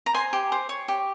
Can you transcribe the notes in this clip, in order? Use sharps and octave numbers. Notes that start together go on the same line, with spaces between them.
A#5
C5 G#5 C6
G4
C5
C#5
G4